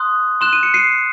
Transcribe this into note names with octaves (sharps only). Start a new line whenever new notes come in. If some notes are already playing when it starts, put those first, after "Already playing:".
Already playing: C6 D#6 F#6
C6 F#6 E7
D#7
C#7
C7 D#7